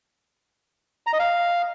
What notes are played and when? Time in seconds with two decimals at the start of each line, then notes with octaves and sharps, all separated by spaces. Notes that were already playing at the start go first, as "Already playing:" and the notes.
1.07 A#5
1.13 D#5
1.20 F5